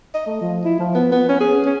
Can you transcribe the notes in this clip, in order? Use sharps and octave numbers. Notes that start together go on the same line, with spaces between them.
D#5
A3
F3
E4
F3
B3
B3
C#4
G#4
C#4